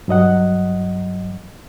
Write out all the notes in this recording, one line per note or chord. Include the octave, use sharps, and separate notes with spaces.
G2 F#3 D#5 F#5